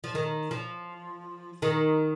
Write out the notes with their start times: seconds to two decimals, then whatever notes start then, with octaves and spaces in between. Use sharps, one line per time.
0.04 F3
0.15 D#3
0.51 F3
1.62 D#3